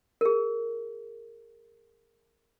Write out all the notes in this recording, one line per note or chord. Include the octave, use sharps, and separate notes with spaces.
G#4 A#4